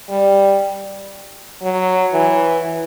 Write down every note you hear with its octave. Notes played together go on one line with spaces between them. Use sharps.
G3
F#3
E3